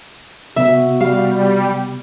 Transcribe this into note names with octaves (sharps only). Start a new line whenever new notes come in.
C3 B3 F#4 E5
G3 F5